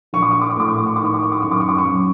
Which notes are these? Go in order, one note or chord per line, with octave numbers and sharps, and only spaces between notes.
A#1 C#6
D6
C#6
D6
C#6
A2 D6
C#6
D6
C#6
D#3 D6
C#6
D6
C#6
D6
F#2 C#6
D6
C#6
D6
C#6
F#2